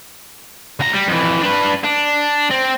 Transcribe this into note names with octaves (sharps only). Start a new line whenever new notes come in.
D2 A#5
G3
F2 E3
D4 B4
D4
C4